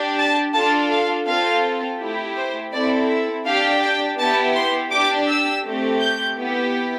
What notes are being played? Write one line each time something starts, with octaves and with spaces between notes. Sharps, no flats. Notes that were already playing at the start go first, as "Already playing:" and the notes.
Already playing: D4 G4
A5
D4 F4 A4 A5
F5
C4 F4 A4 F5
A3 E4 G4
C5
C4 E4 A4 D5
E5
D4 G4 F5
G5
B3 E4 G4 A5
C6
D4 G4 D6
E6
A3 C4 G4
G6
B3 E4 G4